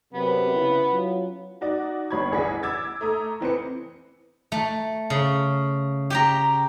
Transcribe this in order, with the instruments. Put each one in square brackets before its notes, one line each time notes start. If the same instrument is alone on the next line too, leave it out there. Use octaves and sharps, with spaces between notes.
[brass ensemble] F#2 C3 [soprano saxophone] B3
[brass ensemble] C#3 E4
F#3 C#4 F4
[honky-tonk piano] D#4 F#4 D5
G1 G3 C#5 B5 C#6 G#6
A1 E2 G#4 D5 F#5 B6
D6 E6 G#6 A6
A3 A#5 D#6
E3 C4 B4 C#7
[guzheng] A3
C#3
G4 G5 A#5